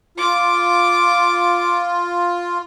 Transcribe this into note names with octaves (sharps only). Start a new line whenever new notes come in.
F4 D6